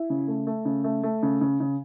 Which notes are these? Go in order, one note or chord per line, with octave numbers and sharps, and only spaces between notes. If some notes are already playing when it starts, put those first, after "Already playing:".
Already playing: E4
C#3
A3
A3
C#3
A3
A3
C#3
C#3
C#3